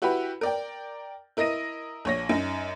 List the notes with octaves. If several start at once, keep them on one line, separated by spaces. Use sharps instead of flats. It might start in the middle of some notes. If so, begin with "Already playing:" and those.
E4 F#4 G4 B4 B5
A#4 D5 G5
E4 A#4 D#5 D#6 A#6 D#7
A#1 C#5 A#6
F#2 D#4